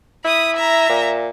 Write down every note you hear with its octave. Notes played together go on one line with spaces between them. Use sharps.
E4 B5 D#6
E5 A#5
A#2